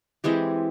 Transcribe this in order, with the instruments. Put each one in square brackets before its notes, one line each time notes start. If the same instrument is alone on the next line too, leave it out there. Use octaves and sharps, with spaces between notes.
[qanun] E3 G#3 C4 G4